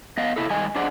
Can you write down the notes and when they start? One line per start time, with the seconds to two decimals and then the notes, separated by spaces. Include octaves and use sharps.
0.17 B3 D#5 F5
0.36 C3 E4 A4
0.50 G2 D#3 G3 D#5 G#5
0.76 D4 G#4 C5 D5 D#5 F#5